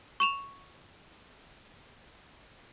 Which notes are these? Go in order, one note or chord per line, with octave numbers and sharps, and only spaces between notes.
C#6 E7 F7